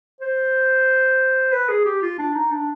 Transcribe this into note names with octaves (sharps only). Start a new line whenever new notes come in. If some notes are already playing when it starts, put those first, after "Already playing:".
C5
B4
G#4
G4
F4
D4
D#4
D4